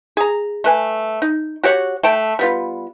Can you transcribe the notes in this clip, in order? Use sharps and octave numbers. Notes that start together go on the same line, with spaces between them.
G#4 A#5
A3 B4 G#5
D#4
F#4 G4 C#5 F#5
A3 G5 A5
G3 B3 F4